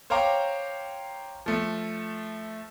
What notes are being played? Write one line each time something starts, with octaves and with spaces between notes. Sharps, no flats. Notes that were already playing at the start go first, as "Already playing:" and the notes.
C5 C#5 F5 G5 A#5 D6
F3 A3